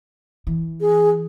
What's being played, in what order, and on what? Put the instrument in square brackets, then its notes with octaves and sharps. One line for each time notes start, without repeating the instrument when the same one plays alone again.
[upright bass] E3
[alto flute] G#4